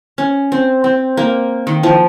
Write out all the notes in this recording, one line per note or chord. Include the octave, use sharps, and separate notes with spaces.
C#4
C4
C4
A#3
D#3
F3